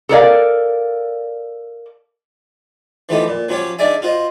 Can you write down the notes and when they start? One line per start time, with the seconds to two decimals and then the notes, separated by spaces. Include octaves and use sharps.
0.09 A4 A#4 D5 F5
3.09 E3 F3 A3 B3 D#4 G4
3.28 A#2
3.49 F3 F#3 C#4 G4 C#5
3.79 D4 D#4 G#4 D5 E5 G#5
4.02 F4 F#4 C5 D#5